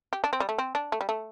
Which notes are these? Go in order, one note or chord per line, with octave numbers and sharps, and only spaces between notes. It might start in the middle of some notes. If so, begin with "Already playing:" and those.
G4
D4
C4
G3
A3
C4
D4
A3
G3
A3